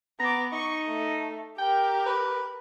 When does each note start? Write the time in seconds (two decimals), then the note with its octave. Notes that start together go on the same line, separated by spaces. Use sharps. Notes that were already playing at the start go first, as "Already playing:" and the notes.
0.20 B3 A#5 D6
0.53 D#4 C#6
0.87 A3
1.58 G4 A#4 G5
2.06 B4